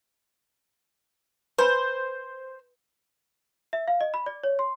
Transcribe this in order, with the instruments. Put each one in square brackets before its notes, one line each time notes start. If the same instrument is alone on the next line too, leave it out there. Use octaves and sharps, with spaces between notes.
[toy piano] B4 G#5 B5 [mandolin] C5
[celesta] E5
F5
D#5
B5
D5
C#5
C6